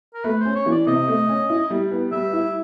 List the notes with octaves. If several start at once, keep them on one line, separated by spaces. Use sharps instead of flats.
A#4
A3 B4
C#4 C5
C#5
E3
D5
C3 D#5
A3
C#4
E4
G3
B3
G3 E5
E4